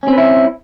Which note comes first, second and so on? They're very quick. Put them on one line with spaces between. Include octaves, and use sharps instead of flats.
C#4 C4 B4 E4